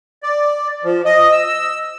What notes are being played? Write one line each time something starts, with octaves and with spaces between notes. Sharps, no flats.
D5
F3
D#5
E6